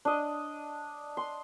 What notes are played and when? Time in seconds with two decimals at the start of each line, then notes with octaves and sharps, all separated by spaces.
0.05 D4 D#5
1.17 C6